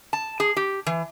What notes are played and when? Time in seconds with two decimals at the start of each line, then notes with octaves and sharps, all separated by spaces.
0.13 A5
0.40 G#4
0.57 G4
0.86 E3